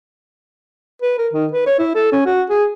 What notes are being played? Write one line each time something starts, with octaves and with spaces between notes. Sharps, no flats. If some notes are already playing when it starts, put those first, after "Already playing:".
B4
A#4
D#3
B4
C#5
E4
A4
C#4
F#4
G#4